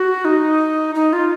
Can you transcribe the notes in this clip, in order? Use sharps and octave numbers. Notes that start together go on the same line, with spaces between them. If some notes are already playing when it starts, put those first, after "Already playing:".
Already playing: F#4
D#4
D#4
F4